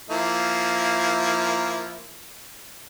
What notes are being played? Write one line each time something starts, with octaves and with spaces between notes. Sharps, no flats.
F3 A#3 E4